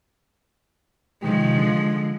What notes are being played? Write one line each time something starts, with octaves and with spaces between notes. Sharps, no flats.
C3 D#3 F3 G#3 G4
D3